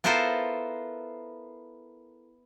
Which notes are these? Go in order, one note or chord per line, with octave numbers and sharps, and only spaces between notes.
B3 E4 F4 A4 A#4 C5